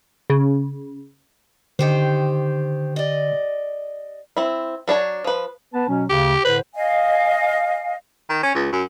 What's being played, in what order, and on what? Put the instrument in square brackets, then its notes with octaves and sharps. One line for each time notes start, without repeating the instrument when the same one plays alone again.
[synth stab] C#3
[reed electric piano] D3 [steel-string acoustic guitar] D#3 G4 C5
[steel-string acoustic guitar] D5 D#5
[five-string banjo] C4 E4
F#3 D4 C#5 A5
F3 B4
[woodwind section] B3 B4 A5
B2 F#3 C#4
[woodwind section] D2 C#3 [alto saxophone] G4
[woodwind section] A2 D3 C5 [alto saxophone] B4
[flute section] D#5 F5 G#5
[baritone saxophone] D#3
C#4
C#2
F#2